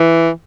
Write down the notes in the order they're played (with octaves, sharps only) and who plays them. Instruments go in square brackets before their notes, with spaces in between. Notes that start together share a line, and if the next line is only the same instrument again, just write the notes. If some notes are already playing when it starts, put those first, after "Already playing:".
Already playing: [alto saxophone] E3